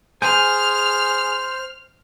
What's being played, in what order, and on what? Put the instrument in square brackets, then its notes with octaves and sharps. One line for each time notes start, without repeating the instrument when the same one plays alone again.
[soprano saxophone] G#4 [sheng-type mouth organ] C5 [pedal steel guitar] G#5 G6 [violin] F6